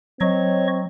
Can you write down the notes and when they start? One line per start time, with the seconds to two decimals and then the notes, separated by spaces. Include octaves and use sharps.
0.21 F#3 C4 C#5 D#5 C#6